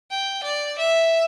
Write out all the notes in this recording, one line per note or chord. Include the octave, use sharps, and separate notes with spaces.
G5
D5
E5